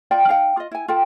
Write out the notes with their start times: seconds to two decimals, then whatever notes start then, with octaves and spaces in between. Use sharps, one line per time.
0.11 F4 D5 G5
0.27 D#4 F5 G5
0.57 F4 D#5
0.71 E4 G#5
0.88 F4 A4 G5